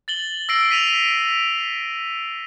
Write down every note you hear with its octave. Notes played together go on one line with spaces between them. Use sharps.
A6 F#7 G7
E6 A#6 C7 D7
B6 D#7 F7